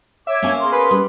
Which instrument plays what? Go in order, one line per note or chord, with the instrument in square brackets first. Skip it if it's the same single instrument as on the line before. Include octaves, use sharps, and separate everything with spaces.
[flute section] C#5 D6 [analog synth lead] E5
[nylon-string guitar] A#3 C#4 G#5 [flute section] C#5
[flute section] G#4 A#4 C6
[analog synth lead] B4
[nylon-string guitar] G3